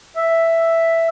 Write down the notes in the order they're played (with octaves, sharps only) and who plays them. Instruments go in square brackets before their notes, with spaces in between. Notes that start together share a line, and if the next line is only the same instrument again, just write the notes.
[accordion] E5